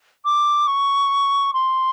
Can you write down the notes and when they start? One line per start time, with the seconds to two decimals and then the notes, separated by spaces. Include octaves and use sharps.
0.25 D6
0.67 C#6
1.54 C6